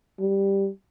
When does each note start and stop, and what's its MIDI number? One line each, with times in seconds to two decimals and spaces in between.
0.20 0.69 55